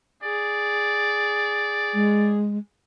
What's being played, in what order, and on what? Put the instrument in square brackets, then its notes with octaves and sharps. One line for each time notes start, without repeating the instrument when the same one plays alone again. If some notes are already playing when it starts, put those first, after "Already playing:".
[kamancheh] G#4 [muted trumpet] D5
[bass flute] G#3